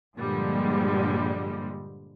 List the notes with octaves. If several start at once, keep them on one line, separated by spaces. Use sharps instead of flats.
G2 A#2 D3 F3 G3 G#3